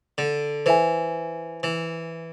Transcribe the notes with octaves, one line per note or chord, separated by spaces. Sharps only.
D3
E3 C5 E5 G#5
E3